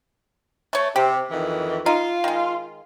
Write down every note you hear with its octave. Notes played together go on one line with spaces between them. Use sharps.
A3 C#5
C3 G4
F2 D#3 E3
D#4 F4
D#3 G#3